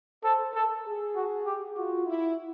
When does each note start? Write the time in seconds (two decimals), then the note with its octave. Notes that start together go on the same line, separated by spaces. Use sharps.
0.23 A4 C5
0.55 A4 A#4
0.85 G#4
1.16 F#4
1.46 G4
1.76 F4 F#4
2.07 E4